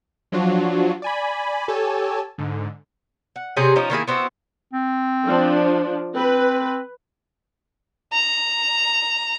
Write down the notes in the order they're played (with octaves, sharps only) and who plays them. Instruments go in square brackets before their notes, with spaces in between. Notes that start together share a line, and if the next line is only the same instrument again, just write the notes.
[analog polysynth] F3 F#3 D4 F4 F#4
D5 G#5 B5
G4 A4 C#5 G#5 A5
G#2 D3
[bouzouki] F#5
C3 C#4 G#4
F3 C#4 D#4
D#3 A#3 E4 G#4
B3 C4 E4 F#4
[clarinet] C4
[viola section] F3 D4
[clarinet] C4 [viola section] B4
[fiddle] A#5